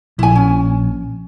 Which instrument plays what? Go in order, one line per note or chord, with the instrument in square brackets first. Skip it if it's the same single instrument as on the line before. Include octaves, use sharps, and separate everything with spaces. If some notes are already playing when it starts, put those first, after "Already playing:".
[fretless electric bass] A#1 [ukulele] E4 G#5
[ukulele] C#4